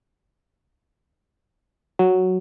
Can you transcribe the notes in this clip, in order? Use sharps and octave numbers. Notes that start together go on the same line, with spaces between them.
F#3